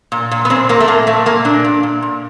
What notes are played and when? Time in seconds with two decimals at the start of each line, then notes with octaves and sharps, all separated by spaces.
0.12 A#2
0.31 A#2
0.45 B3
0.50 A#2 C4
0.69 A#2 A#3
0.80 A3
0.88 A#2 A#3
1.07 A#2 A3
1.26 A#2 A#3
1.45 A#2 D4
1.65 A#2
1.83 A#2
2.03 A#2